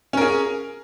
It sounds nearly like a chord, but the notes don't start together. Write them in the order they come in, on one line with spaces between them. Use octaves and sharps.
C#4 A#4 G#4